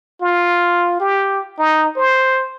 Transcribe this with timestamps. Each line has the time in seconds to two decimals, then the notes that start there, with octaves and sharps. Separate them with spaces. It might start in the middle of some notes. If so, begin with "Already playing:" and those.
0.21 F4
1.00 G4
1.59 D#4
1.96 C5